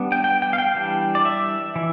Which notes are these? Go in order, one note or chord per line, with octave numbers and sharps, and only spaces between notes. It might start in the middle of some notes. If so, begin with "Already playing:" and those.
Already playing: G3 B3 D4
G5
G5
G5
F5
G5
E3 G3 D4
D5
E5
E3